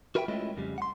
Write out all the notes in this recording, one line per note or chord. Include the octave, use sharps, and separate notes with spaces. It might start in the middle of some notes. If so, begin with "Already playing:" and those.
F#4 A#4 B4 E5 F5 G5
G#3 A3 C#4 E4 F4 D#5
F2 C#3 G3
F#5 C6